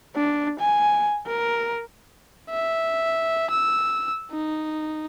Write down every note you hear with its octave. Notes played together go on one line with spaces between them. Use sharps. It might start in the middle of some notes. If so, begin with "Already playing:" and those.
D4
G#5
A#4
E5
E6
D#4